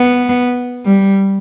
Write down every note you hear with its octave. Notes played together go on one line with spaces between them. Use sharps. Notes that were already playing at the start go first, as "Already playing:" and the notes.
Already playing: B3
G3